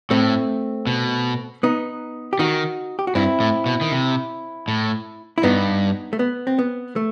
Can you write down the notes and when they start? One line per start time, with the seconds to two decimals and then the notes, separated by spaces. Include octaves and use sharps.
0.10 A2 A3 C4
0.87 B2
1.63 B3 D#4
2.33 G4
2.39 D#3 D#4 F#4
2.99 G4
3.07 F#4
3.15 G2 C4 E4
3.40 A2
3.66 B2
3.81 D#3
3.92 C3
4.68 A2
5.38 E4
5.43 G2 B3 D#4
6.13 A3
6.19 B3
6.47 C4
6.59 B3
6.96 A3